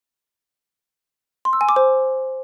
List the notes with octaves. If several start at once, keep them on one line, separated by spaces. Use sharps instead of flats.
C6
E6
G#5
D6
C5